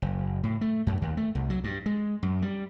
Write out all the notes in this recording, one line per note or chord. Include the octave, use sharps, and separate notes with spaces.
F#1
A2
A3
F#2
D#2
A3
C2
F#3
G2
G#3
F#2
G3